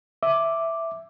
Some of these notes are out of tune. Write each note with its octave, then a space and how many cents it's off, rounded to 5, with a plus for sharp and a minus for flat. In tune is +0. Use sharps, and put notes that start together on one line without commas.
E5 +0 D6 +0